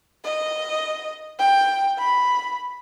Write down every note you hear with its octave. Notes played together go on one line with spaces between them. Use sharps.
D#5
G5
B5